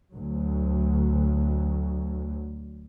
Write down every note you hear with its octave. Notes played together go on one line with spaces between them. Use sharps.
D2 F#3